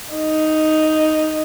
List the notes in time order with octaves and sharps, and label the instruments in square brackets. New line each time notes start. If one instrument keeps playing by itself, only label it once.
[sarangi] D#4